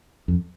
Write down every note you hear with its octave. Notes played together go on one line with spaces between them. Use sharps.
F2